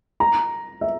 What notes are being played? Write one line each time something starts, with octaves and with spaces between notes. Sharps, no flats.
A#5
E5